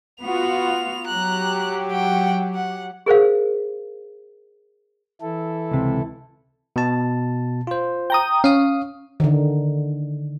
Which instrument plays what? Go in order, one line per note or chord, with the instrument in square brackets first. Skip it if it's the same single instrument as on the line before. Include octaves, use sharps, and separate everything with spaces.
[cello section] B3 F4 F#4 [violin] F7
[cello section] F#3 G4 [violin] A#5 F#6
[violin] F#5 G5
F#5
[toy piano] G#4 A#4 C5 F5
[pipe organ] E3 E4 A4
[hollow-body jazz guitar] C#2 C3
[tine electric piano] B2 A5
F4 C5
[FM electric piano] G5 A#5 D#6
[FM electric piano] C#4 [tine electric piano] F5 D#6
[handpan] D3 D#3